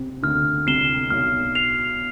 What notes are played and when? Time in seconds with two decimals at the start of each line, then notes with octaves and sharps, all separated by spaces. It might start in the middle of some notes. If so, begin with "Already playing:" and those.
Already playing: C3 C4
0.23 D2 D3 F6
0.67 C2 C3 C7 E7 G7
1.10 B1 B2 F6
1.55 C7 F7